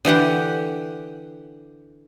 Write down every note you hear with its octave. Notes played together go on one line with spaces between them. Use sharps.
D3 E3 G4 F#5